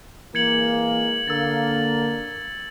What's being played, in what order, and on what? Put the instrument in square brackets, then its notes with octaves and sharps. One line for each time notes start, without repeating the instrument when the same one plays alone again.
[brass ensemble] E3 G#3 A#3 [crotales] G#6 C#7 F#7
[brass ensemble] D3 A#3 [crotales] E6 A6